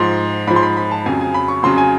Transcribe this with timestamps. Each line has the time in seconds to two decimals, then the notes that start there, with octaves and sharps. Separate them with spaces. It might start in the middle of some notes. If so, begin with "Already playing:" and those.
Already playing: G#2 F3 C6
0.47 G#2 F3 B5
0.56 C6
0.63 B5
0.77 B5
0.91 A5
1.06 F2 C#3 F#3 G#5
1.21 G#5
1.34 B5
1.48 C#6
1.63 F2 C#3 F#3 C6
1.78 G#5